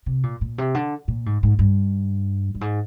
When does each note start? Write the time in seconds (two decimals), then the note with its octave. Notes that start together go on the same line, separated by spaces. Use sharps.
0.06 C3
0.23 A#2
0.41 A#2
0.58 C3
0.74 D3
1.08 A#2
1.26 G#2
1.43 G#2
1.59 G2
2.54 G2
2.61 G#2